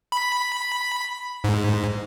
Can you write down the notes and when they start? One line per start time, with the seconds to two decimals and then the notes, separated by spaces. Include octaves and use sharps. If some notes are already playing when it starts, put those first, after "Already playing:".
0.12 B5
1.44 G#2